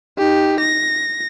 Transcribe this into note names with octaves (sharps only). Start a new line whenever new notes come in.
D#4 G4
A#6